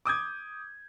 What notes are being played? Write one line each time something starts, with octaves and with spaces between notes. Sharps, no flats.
D6 D#6 G6 G#6